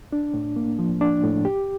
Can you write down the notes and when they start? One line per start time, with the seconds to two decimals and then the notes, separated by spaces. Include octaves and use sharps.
0.13 D4
0.34 A2
0.56 A#3
0.79 F3
1.01 D4
1.24 A2
1.45 G4